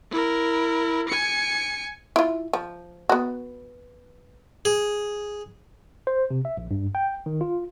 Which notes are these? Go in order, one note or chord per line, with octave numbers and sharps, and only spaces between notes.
E4 A#4
G#5 C#7
E4 F4
F3
B3 F#4
G#4
C5
C3
E5
A#1
G2
G5
D#3
F4